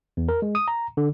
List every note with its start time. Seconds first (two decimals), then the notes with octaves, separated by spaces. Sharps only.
0.17 E2
0.29 A#4
0.42 G#3
0.55 D#6
0.68 A#5
0.97 D3